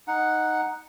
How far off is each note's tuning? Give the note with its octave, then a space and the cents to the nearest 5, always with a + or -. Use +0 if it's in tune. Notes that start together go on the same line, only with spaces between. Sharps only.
D#4 +0 F#5 +0